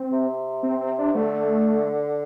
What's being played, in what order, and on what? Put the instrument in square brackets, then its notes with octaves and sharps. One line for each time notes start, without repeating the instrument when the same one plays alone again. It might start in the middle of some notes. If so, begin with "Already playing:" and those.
Already playing: [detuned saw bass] C4
[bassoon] C3
[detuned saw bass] C4
C4
D4
[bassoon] D3 [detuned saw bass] A3